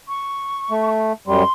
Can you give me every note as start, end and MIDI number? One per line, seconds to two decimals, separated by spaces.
0.08 0.98 85
0.71 1.13 57
1.27 1.43 42
1.27 1.43 55
1.27 1.52 84